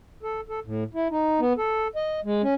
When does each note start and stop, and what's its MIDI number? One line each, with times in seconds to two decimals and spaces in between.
0.23 0.41 69
0.49 0.60 69
0.65 0.84 45
0.94 1.08 64
1.11 1.40 63
1.40 1.53 59
1.58 1.88 69
1.96 2.20 75
2.25 2.42 56
2.43 2.54 61